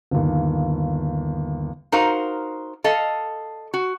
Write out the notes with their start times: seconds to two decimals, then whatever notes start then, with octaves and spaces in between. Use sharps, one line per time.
0.11 G1 D#2
1.92 D#4 F#4 A#4 C5 F5
2.84 A4 D#5 F5
3.74 F#4